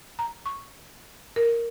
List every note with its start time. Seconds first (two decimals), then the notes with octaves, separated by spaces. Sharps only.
0.19 A#5
0.46 C#6
1.36 A#4